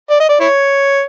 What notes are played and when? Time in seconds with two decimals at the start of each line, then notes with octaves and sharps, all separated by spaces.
0.10 D5
0.20 D#5
0.29 D5
0.40 E4 C#5